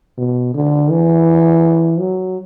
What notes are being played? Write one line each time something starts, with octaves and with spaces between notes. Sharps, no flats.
B2
D3
E3
F#3